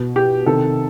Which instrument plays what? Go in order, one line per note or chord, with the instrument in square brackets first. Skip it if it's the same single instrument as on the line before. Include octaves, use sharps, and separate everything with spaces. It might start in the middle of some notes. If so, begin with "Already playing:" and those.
Already playing: [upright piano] B2
G4
C3 D#3 A4